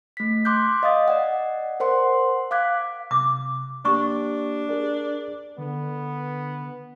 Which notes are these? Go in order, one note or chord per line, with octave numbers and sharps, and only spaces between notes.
A3 B6
C6 D6 F#6 G6
D#5 F5 D#6 A6
D5 D#5 F#5
A#4 C5 F#5 C6
F5 D6 F#6 G#6 B6
C3 D6
A#3 D4 G4 C#6
G#4 A#4 D5
D3 B3